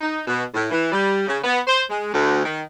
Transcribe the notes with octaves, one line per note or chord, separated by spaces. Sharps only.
D#4
B2
A2
E3
G3
C#3
B3
C5
G#3
D2
D#3